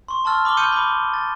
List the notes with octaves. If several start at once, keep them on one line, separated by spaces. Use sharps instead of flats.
C6 C#6
A5 C6 C#6 E6 F6 A6
B5 D6 F6 G7
B5 C#6 D#6 G6 C#7 D#7
B5 D6
A6